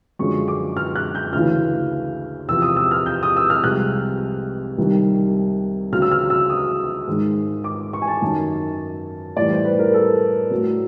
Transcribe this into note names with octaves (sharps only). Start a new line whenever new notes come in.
F#2 D3 F3 G#3 C#6
D6
F6
F#6
G6
D2 C#3 E3 F6
E2 C3 F3 E6
D#6
E6
F6
G6
D#6
E6
F6
C2 C3 F3 G#3 F#6
C2 C3 D#3 G3
D2 C#3 F#3 F6
E6
F6
E6
D#6
G#2 D#3 G#3
D6
C#6
G#5
A5
F#2 D#3 F#3
A2 E3 G3 D5
C5
B4
A#4
A4
A2 F#3